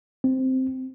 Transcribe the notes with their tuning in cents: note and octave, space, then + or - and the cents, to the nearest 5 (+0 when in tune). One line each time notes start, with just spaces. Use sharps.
C4 -5